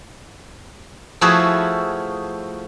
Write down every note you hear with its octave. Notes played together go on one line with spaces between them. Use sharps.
F3 A3 E4 F#4 G#4 B4